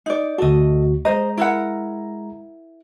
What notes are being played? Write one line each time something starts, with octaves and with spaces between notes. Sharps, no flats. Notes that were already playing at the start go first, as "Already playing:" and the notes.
D#4 D5
D2 F#4 A4 D#5
G#3 C5 D#5 A#5
E4 A#4 F#5